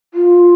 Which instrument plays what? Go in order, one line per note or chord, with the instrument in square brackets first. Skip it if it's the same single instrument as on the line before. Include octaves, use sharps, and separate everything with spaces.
[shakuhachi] F4